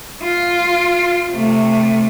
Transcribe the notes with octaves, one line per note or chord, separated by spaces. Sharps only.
F4
C3 A3